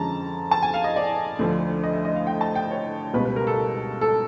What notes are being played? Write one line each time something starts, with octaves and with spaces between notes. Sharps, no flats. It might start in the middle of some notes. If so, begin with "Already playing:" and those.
Already playing: F2 D3 F3 G#3 C#4 A5 A#5
A5
G#5
F5
D#5
D5
D2 D3 F3
D#5
E5
D#5
F5
G5
A5
G5
C#5
C#2 B2 G3 B4
B4
A#4
A4
A4